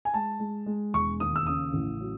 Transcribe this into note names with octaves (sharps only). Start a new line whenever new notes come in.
G#5
G#3 A5
G#3
G#3
E1 C#6
D#2 D#6
E6
C#3 D#6
A1
F#3